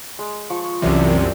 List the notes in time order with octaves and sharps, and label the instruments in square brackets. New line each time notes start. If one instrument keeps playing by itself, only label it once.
[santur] G#3
[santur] F3 [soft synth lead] C#6
[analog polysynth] C2 F#2 C3 [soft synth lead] E3 [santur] D5 A5